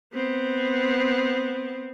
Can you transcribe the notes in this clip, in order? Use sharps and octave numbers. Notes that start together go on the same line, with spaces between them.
B3 C4